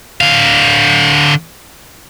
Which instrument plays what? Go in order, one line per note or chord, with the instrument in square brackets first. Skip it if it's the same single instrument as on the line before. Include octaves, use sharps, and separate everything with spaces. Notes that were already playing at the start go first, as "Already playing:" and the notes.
[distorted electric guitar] D3 F5